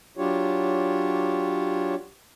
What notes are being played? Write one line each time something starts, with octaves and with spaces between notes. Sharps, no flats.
F#3 D4 F4 G4 C#5